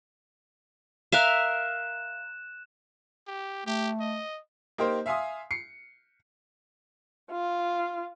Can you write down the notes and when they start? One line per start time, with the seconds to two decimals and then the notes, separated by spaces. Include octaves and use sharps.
1.12 A#4 E5 F5 F#6 E7
3.27 G4
3.66 A3 G4
4.00 D#5
4.78 A#3 D#4 G4 A#4 C5
5.06 E5 F5 G#5 C6 D#6
5.51 C7 C#7
7.31 F4